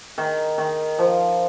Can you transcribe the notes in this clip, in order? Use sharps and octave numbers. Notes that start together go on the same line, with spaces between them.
D#3
D#3
F3